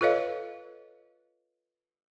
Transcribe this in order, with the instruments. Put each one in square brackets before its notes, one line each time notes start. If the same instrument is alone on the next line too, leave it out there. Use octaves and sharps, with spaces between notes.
[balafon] F4 A4 B4 C#5 D#5 F5